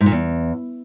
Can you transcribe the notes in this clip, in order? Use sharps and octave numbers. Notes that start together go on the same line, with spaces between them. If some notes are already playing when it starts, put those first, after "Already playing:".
G#2
A#2
E2